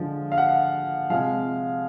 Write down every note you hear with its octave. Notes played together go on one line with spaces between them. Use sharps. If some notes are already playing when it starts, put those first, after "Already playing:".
Already playing: D3 F3 G#3
F5
F#5
C3 F3 G#3 F5